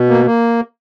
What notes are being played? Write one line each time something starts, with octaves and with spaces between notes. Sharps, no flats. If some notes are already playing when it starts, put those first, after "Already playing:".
Already playing: B2
A#3
A#3